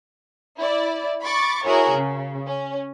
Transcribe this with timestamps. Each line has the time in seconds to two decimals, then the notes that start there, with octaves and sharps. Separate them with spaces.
0.58 E4 D5
1.23 B5 C#6 D6 A6
1.65 E4 F#4 G#4 A#4 C#5
1.94 C#3
2.46 C#4